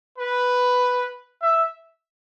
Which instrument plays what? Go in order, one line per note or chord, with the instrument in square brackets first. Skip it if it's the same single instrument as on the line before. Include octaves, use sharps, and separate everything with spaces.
[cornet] B4
E5